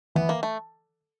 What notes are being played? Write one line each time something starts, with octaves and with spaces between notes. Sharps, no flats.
E3 B3
A#3
A3